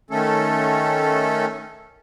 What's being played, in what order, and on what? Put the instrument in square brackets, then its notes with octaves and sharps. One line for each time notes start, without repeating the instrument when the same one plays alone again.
[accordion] D#3 A3 C#4 A4